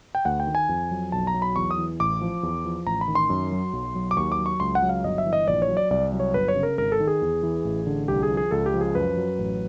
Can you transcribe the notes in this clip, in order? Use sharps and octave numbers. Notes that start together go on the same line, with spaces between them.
G5
D2 F#5
G5
D#3
G#5
F2
F#3
B1 A5
A#5
F#3
B5
E2 C#6
D#6
E3
A1 D6
F3
E2
F3
A1 A#5
B5
D#3
C6
F#2
F#3
B1
F#3
D6
D#2 C#6
D6
F#3
C#6
C#2 C6
F#5
F#3
F5
G1 D#5
E5
E3
D#5
A#1 D5
C#5
F#3
D5
C2 D5
F#3
C#5
G1 B4
C#5
C#3
A#4
G#1 A#4
A4
D#3
G#4
E2
E3
A1
D3
C2 G4
G#4
F3
G#4
C#2 A4
G4
F3
G#4
F#2 B4
F#3
A1